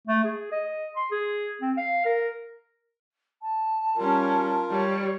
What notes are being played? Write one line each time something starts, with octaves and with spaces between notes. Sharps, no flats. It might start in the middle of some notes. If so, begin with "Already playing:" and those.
A3
G#4
D#5
C6
G#4
C4
F5
A#4
A5
G3 C#4 F4 A#4
G3 C#5